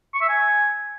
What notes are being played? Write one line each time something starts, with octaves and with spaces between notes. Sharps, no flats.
C#6
E5
G#5